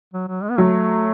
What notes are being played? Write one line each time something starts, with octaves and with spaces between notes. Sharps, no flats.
F#3
F#3
G#3
B3
F#3 A3